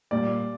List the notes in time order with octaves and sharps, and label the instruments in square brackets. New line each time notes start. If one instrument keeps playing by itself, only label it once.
[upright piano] A#2 G3 A#3 [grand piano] D5